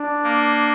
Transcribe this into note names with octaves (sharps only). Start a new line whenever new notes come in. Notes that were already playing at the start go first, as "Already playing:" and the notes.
Already playing: D4
A#3